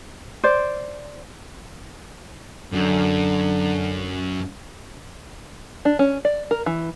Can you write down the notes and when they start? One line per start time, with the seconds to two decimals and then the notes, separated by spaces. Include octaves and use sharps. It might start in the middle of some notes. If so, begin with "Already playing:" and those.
0.44 C5 D5
2.72 F#2 D3
5.85 D4
5.99 C#4
6.25 D5
6.51 A#4
6.66 E3